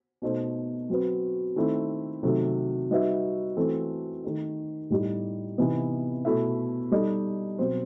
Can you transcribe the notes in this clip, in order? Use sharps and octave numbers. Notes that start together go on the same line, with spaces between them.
B2 A3 D#4 A4 C5
F#3 C4 F#4 B4
D#3 A3 C4 E4
C3 D#3 F#3 A3
G3 D#4 F#4 B4 E5
E3 A3 C4 F#4 A4
D#3 A3 D#4
A2 G3 D#4 G4
C3 E3 B3 D#4
B2 A3 E4 A4 E5
G3 D#4 A4 D#5
B2 F#3 C4 F#4 C5